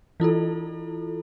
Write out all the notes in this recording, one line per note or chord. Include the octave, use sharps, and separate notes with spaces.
E3 E4 F4 A4